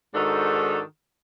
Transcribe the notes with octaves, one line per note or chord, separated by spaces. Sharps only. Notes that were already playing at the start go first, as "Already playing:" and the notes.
G#2 D#3 D4 F#4 A4